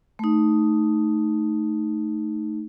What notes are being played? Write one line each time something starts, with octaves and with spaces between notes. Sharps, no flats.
A3 D#4